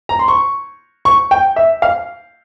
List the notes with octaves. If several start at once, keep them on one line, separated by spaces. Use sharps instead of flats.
A#5
C6
C#6
C#6
G5
E5
F5